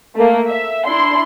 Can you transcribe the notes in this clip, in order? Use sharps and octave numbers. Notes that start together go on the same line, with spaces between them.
A3 A#3
E5
D4 E4 C6